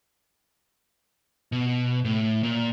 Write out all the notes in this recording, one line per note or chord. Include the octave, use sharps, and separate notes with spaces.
B2
A2
A#2